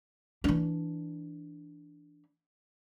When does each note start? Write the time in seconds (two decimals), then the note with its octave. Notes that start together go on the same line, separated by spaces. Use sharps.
0.44 E3 D4